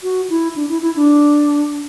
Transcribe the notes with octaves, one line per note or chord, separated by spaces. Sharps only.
F#4
E4
D4
E4
E4
D4